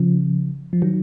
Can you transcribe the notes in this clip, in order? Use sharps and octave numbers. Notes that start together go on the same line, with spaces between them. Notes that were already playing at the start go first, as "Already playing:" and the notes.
Already playing: C#3 F3
F3
D#3 F#3